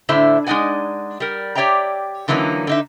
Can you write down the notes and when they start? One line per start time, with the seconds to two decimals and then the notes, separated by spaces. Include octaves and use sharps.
0.09 A2 D3 E4 C5 E5
0.47 G#3 D4 D#4 D5 F#5 G#5
1.20 G3 A#4
1.55 G4 C#5 D5 E5 G5 A#5
2.28 D3 E3 F#3 A#3 C#4 D#4
2.67 D3 D#4 E5